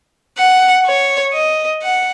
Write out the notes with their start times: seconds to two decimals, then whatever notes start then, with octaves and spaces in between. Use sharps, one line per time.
0.38 F#5
0.86 C#5
1.34 D#5
1.82 F#5